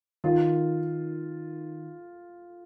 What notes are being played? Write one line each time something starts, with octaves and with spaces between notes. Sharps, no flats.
D#3 F4